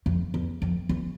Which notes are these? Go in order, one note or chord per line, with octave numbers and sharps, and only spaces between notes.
F2
E2
F2
E2